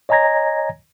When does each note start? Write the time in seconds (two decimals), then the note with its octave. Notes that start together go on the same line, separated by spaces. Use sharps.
0.09 C#5 D#5 G#5 A#5 G#6 A#6